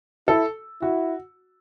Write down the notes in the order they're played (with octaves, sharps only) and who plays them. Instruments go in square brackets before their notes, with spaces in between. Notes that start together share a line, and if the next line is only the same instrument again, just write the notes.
[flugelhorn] E4 [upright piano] A4
[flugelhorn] E4 [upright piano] F#4